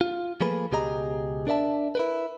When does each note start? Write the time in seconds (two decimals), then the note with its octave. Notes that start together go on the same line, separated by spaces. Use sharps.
0.01 F4
0.41 F3 A3 A#3 G#4 B4
0.71 C#2 B2 G4 G#4 D#5 A#5
1.47 D4 A#4 D5 E5 A5
1.95 E4 A#4 B4